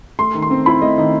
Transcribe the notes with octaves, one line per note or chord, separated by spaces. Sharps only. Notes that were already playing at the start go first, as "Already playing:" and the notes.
A3 C6
D#3
C6
C4
E4 B5
A3 D#5
D#3 D#5